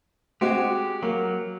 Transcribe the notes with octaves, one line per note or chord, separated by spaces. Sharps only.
G#3 C4 F#4 G4
F#3 A#3